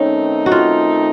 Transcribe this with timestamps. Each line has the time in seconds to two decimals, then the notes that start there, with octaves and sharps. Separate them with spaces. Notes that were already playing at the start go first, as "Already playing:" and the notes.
Already playing: D#3 A3 C4 C#4 D#4
0.46 F#4
0.52 F4